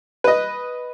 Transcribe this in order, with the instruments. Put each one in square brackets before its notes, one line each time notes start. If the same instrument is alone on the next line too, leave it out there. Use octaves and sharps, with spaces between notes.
[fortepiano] B4 D#5